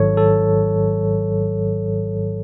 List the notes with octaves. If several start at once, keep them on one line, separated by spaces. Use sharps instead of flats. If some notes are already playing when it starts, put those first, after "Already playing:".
Already playing: G#1 G#2 D#3 F#3 A4 C#5
A4